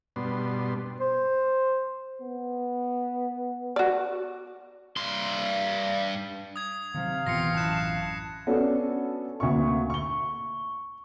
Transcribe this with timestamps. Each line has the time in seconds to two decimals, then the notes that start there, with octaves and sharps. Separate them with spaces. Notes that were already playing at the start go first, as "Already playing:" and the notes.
0.16 G2 B2 B3 D4 C6
1.00 C5
2.21 B3
3.76 F#4 D5
4.97 G2 C6
6.56 D#6 G#6
6.94 C3 D#3 F#3 F5
7.26 A1 B2 E3 F4 G5 A#6 C7 C#7
7.57 F#2 E4 A5 F#6 E7
8.47 B3 C#4 D4 F#4 A4
9.40 D2 A#3 C#6
9.90 C#6 G7